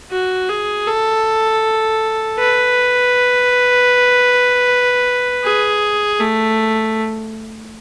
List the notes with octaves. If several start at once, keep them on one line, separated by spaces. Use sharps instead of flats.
F#4
G#4
A4
B4
G#4
A3